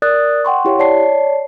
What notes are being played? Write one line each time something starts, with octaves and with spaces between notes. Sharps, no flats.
A#4 D5 D#6 F#6 A6
F#5 G5 C6 C#6
E4 G4 C#5 F5
C#5 D5 A5 C7